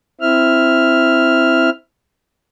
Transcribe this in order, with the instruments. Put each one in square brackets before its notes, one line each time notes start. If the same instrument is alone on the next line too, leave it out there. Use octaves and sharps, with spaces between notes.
[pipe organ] C4 E4 E5 F6